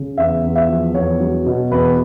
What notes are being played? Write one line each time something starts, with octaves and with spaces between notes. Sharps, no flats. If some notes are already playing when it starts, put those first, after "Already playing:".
Already playing: C#3
E2 E5
E2
E5
F3
E2 C#5
F#3
B2
E2 B4